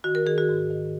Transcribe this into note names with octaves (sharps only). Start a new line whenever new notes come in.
D#3 F#4
A#4
D#3 G#4
F#4
G#2
D#3